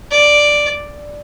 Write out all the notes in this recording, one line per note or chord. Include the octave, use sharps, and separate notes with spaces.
D5